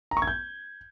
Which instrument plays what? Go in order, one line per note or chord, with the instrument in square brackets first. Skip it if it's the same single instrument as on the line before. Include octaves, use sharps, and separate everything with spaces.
[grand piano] A#5
C#6
G#6
G6